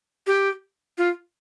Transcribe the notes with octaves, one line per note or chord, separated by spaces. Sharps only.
G4
F4